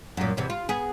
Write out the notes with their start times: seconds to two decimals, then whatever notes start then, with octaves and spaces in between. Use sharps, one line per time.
0.17 F#2 A#2
0.37 E2 C3 E3
0.50 F4
0.69 B3 G#4